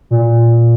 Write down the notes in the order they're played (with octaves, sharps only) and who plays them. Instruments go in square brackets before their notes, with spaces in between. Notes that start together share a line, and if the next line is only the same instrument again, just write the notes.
[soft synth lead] A#2